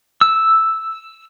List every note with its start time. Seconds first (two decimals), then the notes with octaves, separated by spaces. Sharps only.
0.21 E6